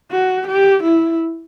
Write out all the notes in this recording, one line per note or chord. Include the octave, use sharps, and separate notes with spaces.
F#4
G4
E4